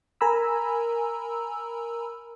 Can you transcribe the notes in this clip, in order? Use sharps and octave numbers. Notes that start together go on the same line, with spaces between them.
A#4 G#5 A#5 B5 E6